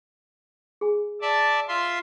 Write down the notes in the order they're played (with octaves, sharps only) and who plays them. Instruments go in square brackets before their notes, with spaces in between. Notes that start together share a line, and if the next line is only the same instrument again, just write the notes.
[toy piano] G#4 G#5
[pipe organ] D5 E5 A5
F4 E5 C6